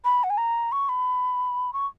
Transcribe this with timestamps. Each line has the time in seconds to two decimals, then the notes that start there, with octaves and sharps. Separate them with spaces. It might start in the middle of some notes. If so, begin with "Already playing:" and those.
0.05 B5
0.24 F#5
0.30 G#5
0.38 A#5
0.72 C#6
0.89 B5
1.73 C#6